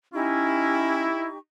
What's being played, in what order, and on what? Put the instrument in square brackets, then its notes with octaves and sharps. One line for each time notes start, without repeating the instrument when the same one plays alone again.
[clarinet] C#4 [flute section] D#4 G4 C#6 [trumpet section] E4